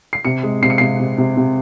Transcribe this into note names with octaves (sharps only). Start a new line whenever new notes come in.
C7
C3 C#7
G#3
C3 C7
C#7
C3 C7
C3
C3
C3